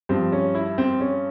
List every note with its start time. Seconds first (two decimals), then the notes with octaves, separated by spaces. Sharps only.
0.09 G2 F3 C4
0.33 C#4
0.55 E4
0.78 C4
1.01 C#4